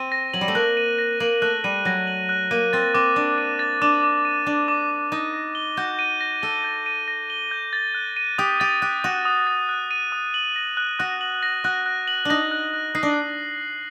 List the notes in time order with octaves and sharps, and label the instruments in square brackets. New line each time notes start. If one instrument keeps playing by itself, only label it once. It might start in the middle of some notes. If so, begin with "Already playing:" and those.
Already playing: [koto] C4 [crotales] D#7
[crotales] A#6
[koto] F#3 [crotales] F#7
[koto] G3
A3
[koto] A#3 [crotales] F#6
[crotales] D#7
A#6
[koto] A#3 [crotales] F#7
[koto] A3 [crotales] F#6
[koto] G3 [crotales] D#7
[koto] F#3 [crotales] A#6
[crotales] F#7
F#6
[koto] A#3 [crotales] D#7
[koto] C4 [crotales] A6
[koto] C4 [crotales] D6
[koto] D4 [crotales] D6
[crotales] D#7
A6
[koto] D4 [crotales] D6
[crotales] D6
D#7
[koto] D4 [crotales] A6
[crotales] D6
D6
[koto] D#4 [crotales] D#7
[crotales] A#6
G7
[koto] F#4 [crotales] G6
[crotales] D#7
A#6
[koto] A4 [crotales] G7
[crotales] G6
D#7
A#6
G7
G6
A6
F#6
D#7
[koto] G4 [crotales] D#6
[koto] G4 [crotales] A6
[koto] G4 [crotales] F#6
[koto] F#4 [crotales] D#7
[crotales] D#6
A6
F#6
D#7
D#6
F#7
A#6
F#6
[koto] F#4 [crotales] F#6
[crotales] F#7
A#6
[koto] F#4 [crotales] F#6
[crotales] F#6
F#7
[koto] D4 D#4 [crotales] A#6
[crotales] F#6
F#6
[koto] D#4 [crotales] C7
[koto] D4